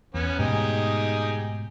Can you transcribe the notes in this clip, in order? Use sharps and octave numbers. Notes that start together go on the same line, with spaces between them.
E2 B3 C#4
G#2 B2 A3 D#4 G4 G#4